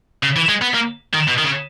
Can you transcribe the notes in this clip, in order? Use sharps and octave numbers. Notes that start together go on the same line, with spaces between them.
C#3
E3
G#3
B3
A#3
D#3
B2
D#3
C#3